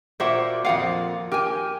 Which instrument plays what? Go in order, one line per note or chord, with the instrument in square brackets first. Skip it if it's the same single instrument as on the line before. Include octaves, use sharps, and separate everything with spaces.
[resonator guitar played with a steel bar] A#2 C5 D5 [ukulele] F#4 E5 F#5
[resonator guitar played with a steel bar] F2 A#2 [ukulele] F5 F#5
[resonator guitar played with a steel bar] G4 [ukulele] A#4 G#5